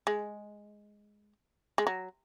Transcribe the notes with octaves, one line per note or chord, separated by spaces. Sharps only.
G#3
G#3
F#3